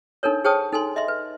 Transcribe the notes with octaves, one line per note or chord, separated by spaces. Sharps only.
D4 D#4 A4 A#4 C#5
G#4 C5 C#5 G5 A5 D#6
D#4 A4 G#5 C6
D#5 E5 C6
B4